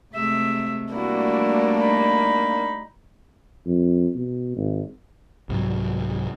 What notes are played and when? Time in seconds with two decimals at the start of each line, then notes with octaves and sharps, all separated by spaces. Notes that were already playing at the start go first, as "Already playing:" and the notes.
0.15 C3 G#3 A3 E5
0.92 G3 A3 A#3 D4 E4 F#4
1.79 D#4 B5
3.66 F2
4.15 B2
4.56 G#1
5.49 C2 G#2 F#3